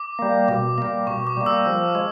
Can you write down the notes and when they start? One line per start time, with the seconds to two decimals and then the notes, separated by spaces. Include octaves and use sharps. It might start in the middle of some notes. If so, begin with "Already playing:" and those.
Already playing: D6
0.19 G3 A#3
0.48 B2 D6
0.78 G3 A#3
1.07 B2 C#6
1.27 D6
1.37 G3 A#3
1.46 E6
1.66 F3
1.95 G#3